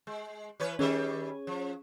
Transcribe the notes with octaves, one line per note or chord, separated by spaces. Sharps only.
G#3
E3 B4 C#5
D#3 G3 C#4 G#4 C#5 E5
F3